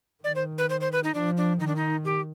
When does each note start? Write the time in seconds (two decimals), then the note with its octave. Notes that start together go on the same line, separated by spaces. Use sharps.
0.24 D#3 D5
0.35 C5
0.58 B4
0.70 C5
0.81 C5
0.92 B4
1.04 D#4
1.14 F3 D4
1.37 D4
1.60 D#3 D#4
1.67 D4
1.76 D#4
2.05 G4